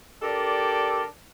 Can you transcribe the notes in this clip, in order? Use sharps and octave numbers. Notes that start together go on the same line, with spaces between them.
D4 G4 A4 A#4 D5